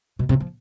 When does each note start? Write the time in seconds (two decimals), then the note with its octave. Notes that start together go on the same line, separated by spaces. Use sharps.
0.19 B2
0.29 C3
0.40 F3